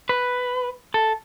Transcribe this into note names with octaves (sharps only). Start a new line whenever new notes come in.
B4
A4